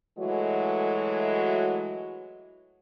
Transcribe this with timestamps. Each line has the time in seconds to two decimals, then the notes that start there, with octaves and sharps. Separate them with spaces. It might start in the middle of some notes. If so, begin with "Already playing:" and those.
0.17 E3 F#3 G#3 A3 F#4